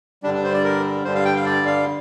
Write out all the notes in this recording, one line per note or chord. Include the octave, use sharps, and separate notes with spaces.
G2 D3 G3 D4
D4
C5
D5
A#4
G2 D3 G3 C5
F5
G5
F5
D5
F5